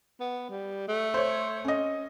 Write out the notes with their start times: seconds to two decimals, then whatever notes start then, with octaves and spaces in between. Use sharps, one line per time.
0.20 B3
0.50 G3
0.88 A3
1.14 C5 C#5
1.64 C#4 D#5